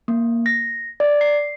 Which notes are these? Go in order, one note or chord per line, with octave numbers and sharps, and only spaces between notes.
A#3
A#6
D5
C7